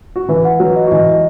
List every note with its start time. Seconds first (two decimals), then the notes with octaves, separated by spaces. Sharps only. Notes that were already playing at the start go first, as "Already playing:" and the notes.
0.16 F#4
0.29 E3 E4 B4
0.45 F#5
0.60 F#3 F#4 B4
0.76 D#5
0.87 F#4
0.91 E3 E4 D#5
1.08 D#5